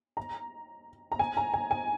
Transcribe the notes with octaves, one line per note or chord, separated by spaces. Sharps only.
A#5
A#5
G#5
A#5
G#5
G#5